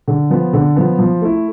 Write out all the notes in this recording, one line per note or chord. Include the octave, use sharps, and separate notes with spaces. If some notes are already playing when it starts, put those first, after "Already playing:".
D3
F3 B3
D3
F3 B3
F3
A3 E4